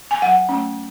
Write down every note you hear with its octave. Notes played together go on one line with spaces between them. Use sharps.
G#5
F#3 F#5
A3 C#4